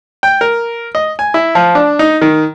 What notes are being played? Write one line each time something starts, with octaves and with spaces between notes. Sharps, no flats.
G5
A#4
D#5
G#5
E4
F3
D4
D#4
D#3